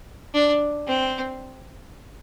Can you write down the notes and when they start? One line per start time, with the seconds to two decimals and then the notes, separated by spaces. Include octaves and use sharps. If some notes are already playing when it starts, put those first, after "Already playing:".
0.34 D4
0.88 C4